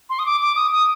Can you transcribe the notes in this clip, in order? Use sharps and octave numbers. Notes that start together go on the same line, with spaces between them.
C6
D#6
D6
D6
D#6
D#6